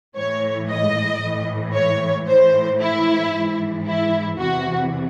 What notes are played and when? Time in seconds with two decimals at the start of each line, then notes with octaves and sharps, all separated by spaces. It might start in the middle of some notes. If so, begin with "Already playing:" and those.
0.16 A2 E3 C#5
0.69 D#5
1.21 A2 E3
1.74 C#5
2.27 A2 E3 C5
2.80 E4
3.32 G#2 E3
3.86 E4
4.38 E2 C3 E3 F#4